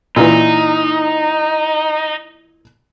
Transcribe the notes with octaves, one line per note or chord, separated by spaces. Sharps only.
A#2 E3 D#4